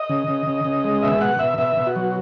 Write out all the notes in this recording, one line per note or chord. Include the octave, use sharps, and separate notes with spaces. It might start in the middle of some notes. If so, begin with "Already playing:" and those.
Already playing: D#5
C#3
C#3
C#3
C#3
G#3
B2 E5
B2 F#5
B2 E5
B2 E5
B2
F#4
F#3